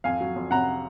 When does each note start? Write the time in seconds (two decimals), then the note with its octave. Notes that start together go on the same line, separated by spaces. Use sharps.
0.04 F2 F5 G#5
0.21 F#3
0.36 F2
0.51 C3 F#5 A#5